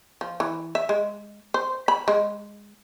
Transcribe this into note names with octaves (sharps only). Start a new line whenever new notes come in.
F3
E3
E5
G#3
C5
B5
G#3